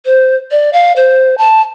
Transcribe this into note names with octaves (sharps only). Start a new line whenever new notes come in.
C5
D5
F5
C5
A5